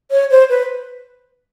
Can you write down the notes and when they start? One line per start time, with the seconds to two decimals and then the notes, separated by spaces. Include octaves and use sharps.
0.11 C#5
0.30 C5
0.50 B4